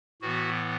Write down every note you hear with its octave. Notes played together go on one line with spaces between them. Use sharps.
A2 E3 B3 F#4